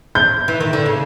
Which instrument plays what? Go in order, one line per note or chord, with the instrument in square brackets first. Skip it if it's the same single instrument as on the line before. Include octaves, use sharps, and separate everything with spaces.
[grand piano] G6
[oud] E3
D#3
D3
C#3